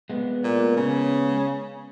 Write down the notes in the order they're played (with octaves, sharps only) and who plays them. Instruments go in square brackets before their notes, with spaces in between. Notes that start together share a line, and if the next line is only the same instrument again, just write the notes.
[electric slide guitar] G#3 B3
[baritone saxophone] A#2
C#3